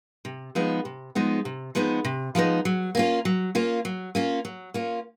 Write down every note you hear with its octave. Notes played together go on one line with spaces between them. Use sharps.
C3
F3 G#3 B3 D#4
C3
F3 G#3 B3 D#4
C3
F3 G#3 B3 D#4
C3
F3 G#3 B3 D#4
F#3
A#3 C#4 F4
F#3
A#3 C#4 F4
F#3
A#3 C#4 F4
F#3
A#3 C#4 F4